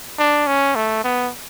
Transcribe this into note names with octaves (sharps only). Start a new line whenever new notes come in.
D4
C#4
A3
B3